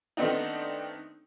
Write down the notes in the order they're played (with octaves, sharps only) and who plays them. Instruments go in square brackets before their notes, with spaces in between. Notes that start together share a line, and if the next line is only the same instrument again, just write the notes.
[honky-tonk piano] D#3 A3 B3 C4 D4 D#4